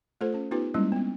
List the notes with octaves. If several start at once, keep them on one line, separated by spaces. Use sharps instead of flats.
A3 F4 A4 C5
C#4
B3 D#4 F4 G4 B4
G3 G#3 A#3 C#4 E4
B3 C4